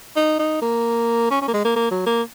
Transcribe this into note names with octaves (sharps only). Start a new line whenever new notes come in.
D#4
D#4
A#3
C#4
C#4
A#3
G#3
A#3
A#3
F#3
A#3